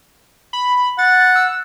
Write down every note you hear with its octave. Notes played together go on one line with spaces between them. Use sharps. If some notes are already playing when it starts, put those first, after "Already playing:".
B5
F#5 A6
E6